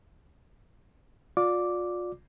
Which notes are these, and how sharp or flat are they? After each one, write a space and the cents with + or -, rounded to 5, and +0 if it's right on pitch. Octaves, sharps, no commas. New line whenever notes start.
F4 +35 D5 +0 D6 -5